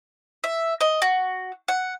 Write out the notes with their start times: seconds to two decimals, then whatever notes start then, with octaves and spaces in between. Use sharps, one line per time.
0.44 E5
0.81 D#5
1.02 F#4
1.68 F#5